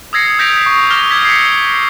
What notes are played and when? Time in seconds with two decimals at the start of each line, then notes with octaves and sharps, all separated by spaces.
0.13 D#6 E6 G#6 A#6 C7 C#7
0.39 D#6 G6 A#6 B6 D7 F7
0.66 C#6
0.90 D6 F6 A#6 F7 G7
1.11 E6 G#6 B6
1.25 C7 C#7